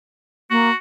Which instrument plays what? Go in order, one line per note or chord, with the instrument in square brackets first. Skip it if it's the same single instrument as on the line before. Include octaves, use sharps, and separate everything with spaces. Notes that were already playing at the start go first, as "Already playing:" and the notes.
[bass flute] A#3 [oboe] F#4